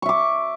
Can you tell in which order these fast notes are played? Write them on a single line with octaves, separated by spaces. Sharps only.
C#6 E5 D6